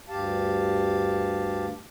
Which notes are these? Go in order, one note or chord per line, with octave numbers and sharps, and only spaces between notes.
D2 G2 G4 F5 A5